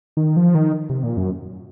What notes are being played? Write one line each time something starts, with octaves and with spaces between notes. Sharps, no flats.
D#3
F3
D#3
C3
A#2
F#2